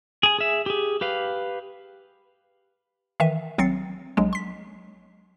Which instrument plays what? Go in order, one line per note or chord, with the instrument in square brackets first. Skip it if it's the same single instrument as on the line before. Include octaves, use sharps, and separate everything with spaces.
[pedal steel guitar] G#4 G#5
G#4 E5
G4 G#4
G4 B4 F5
[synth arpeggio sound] D#3 E3 E5 D#7
G#1 F#3 C4 A6 C7 C#7
A#1 F#3 G#3
C6 B6